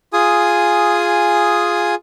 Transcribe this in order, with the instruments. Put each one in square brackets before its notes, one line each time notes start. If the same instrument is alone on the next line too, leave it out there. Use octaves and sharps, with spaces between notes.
[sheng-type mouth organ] F4 G#4 G#5 D#6